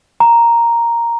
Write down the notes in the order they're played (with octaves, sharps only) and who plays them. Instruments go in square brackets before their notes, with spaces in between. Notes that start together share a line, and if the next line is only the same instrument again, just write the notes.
[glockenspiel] A#5